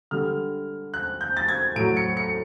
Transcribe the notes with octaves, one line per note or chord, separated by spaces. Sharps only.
D3 G3 F6
F#6
G6
A6
G#6
A2 F#3 D7
C#7
C#7